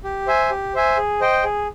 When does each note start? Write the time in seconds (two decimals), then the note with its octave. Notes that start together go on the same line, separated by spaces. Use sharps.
0.04 G4
0.27 C5 E5 G#5
0.50 G4
0.74 C5 E5 G#5
0.97 G#4
1.21 C5 D#5 G5
1.44 G#4